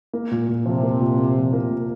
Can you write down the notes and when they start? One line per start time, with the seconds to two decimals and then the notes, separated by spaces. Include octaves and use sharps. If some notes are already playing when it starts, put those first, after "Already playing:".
0.13 A#3
0.31 A#2
0.48 A#2
0.66 C3 F3
0.83 A#3
1.01 A#2
1.18 A#2
1.35 F3
1.53 A#3
1.71 A#2